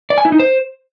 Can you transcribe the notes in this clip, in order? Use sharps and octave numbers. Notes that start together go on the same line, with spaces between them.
D5
G#5
E4
D#4
C5